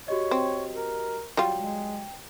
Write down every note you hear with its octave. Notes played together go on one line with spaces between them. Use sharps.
F#4 G4 C#5 D#5
C4
A#4
F#3 G3 F4 G5
G#3